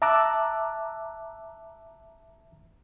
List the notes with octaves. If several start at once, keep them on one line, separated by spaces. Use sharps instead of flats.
E5 A5 A#5 D6 E6 F#6